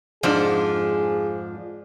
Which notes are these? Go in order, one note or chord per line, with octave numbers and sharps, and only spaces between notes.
F2 G#2 F3 D4 G#4